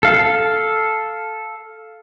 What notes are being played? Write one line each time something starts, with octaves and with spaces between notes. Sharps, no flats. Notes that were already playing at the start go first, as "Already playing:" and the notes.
A4 F5